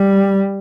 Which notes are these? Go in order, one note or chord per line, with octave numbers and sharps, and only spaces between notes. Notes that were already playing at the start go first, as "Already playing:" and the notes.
Already playing: G3